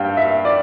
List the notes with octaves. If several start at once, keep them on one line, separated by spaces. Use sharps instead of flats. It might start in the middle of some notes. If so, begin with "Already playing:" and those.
Already playing: G2 F5 G5
E5
D5